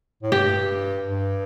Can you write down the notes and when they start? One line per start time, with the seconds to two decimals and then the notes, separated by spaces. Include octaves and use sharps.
0.23 A2
0.32 G2 G4
1.09 G2